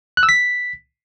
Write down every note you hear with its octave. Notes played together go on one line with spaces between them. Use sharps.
F#6
E6
B6